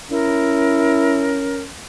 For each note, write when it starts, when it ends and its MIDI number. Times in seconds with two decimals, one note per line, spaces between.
0.11 1.69 61
0.11 1.48 64
0.11 1.62 70